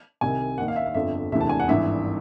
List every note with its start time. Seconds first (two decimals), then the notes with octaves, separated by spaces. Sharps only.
0.21 C2 C3 D#3 G#5
0.58 D#2 D#3 F#5
0.68 F5
0.76 E5
0.86 F5
0.94 G1 F2 D3 F3 E5
1.31 E1 D2 C3 E3 E5
1.41 A5
1.49 G#5
1.60 F#5
1.68 G#1 G2 E3 E5